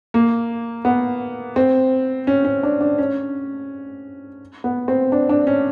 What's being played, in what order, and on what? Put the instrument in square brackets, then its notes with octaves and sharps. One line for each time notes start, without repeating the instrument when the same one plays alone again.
[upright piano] A#3
B3
C4
C#4
C#4
D4
D4
C#4
B3
C4
D4
D4
C#4